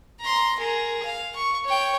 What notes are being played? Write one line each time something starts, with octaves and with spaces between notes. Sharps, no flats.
A#5 C6
G#4 A#4
F5
C#6
C#5 G5